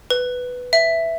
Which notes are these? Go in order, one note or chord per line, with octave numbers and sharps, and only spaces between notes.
B4
E5